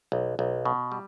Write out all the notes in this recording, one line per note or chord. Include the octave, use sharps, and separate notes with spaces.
B1
B1
B2
G3